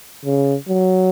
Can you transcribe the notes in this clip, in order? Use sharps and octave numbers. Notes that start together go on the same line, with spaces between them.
C#3
F#3